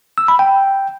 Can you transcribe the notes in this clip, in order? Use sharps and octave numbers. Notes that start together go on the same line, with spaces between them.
E6
B5
G5